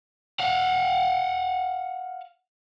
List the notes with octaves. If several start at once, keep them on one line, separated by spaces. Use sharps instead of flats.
F5 F#5